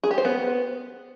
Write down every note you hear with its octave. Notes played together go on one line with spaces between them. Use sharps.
G#4
G4
C5
B3